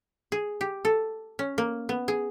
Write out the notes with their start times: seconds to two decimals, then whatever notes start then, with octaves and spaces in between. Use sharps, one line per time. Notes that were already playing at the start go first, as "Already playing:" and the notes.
0.32 G#4
0.61 G4
0.85 A4
1.39 C#4
1.58 A#3
1.89 B3
2.08 G#4